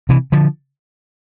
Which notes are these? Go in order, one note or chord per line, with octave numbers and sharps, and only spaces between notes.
C3 E3
D3 F3